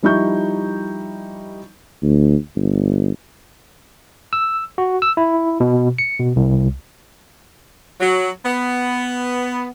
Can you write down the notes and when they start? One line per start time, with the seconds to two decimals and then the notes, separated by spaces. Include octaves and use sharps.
0.03 F3 G3 D#4 E4 C#6 G6
2.03 D2
2.55 G1
4.33 E6
4.78 F#4
5.02 E6
5.17 E4
5.60 B2
5.98 C#7
6.20 B2
6.36 C2
8.00 F#3
8.45 B3